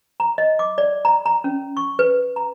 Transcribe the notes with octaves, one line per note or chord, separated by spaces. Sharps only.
A#5
D#5
D6
D5
A#5
A#5
C#4
C#6
B4
A#5